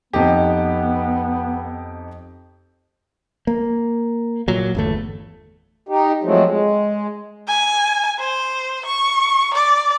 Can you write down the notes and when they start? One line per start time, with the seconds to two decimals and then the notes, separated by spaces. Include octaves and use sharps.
0.13 F2 B3 D#4 G4
3.47 A#3
4.48 A#2 F#3
4.75 G1 E2 A3
5.89 D#4 G4
6.24 F3 F#3 G#3 A3 C4
6.45 G#3
7.48 G#5
8.19 C5
8.86 C#6
9.54 D5